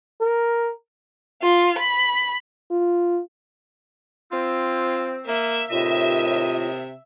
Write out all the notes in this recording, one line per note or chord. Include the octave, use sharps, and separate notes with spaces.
A#4
F4
B5
F4
C4 F4
A#3 E5
D#2 A2 C3 F4 D#5